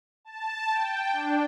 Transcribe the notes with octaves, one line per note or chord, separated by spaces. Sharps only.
A5
G5
D4